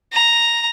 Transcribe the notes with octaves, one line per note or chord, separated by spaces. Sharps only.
A#5